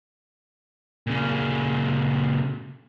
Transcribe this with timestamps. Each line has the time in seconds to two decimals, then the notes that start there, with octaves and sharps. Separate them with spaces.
1.07 A#2 C#3